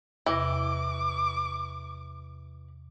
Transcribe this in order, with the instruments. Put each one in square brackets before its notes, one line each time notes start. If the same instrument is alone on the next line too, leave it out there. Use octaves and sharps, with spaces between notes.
[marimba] E2 C3 A#6 [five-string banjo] E3 [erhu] D6